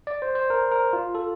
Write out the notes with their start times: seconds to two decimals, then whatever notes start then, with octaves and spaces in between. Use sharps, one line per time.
0.07 D5
0.22 C5
0.35 C5
0.50 A#4
0.72 A#4
0.93 F4
1.15 A4